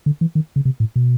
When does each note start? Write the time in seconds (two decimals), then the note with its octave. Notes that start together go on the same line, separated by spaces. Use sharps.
0.06 D3
0.21 E3
0.35 D#3
0.56 C#3
0.65 C3
0.80 A2
0.96 B2